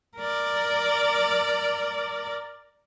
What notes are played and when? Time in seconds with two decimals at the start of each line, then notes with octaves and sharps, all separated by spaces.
0.18 A#4 D5